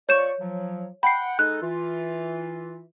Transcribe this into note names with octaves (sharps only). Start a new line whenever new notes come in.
F3 C#5 D5 C#6 G6 E7
F3 F#3
F#5 G5 B5 C7
G#3 D#4 A4 F#6
E3 F4